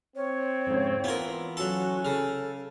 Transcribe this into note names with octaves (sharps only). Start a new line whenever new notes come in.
C4 C#5
F2 G#2 C#3
E3 B3 F4 A#4
F#3 C#4 F#4 A4
C#3 A4 F6